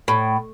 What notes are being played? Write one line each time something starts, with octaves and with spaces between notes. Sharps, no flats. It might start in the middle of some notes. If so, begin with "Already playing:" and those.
A2